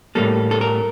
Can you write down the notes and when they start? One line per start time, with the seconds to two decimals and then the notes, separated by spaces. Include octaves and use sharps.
0.15 A2 G3 A#3 A4
0.51 A4
0.61 A#4